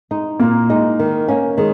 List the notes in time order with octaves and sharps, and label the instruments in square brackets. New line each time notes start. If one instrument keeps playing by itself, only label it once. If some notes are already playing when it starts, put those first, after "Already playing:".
[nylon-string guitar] G#3 D#4
[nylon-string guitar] A#2 [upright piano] A#3
[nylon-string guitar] G#3 D#4
D#3
A#3 C#4
[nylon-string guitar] D#3 [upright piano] G#3